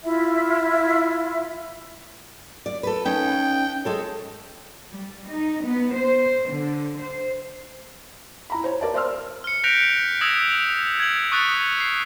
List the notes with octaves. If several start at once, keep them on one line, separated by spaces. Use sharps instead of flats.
E4 F4 E5
D5
A4 B4
C#4 D#4 G5
G#3 A4 C#5
G3
D#4
B3
C5
D3
C5
E4 A#5 B5
C5 C#5
A#4 D5 A5
C5 D5 C6 E6 F6
F6 C#7
F#6 G6 A#6 B6 D7 F7
D#6 E6 G#6 A#6 B6 E7
G#6 F#7
C#6 D#6 F#6 A6 B6 C#7
C7